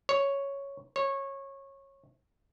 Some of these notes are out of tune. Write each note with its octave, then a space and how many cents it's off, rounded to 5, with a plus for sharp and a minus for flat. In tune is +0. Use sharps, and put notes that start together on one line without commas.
C#5 +0
C#5 -20